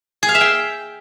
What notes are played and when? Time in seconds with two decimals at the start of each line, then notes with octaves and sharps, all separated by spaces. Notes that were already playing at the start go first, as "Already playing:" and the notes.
0.23 G#4
0.29 F5
0.35 E5
0.41 G5